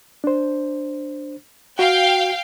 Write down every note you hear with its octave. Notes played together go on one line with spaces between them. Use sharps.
D4 C5
F#4 F5 G5